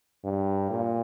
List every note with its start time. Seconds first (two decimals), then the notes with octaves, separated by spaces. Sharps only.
0.24 G2
0.70 A#2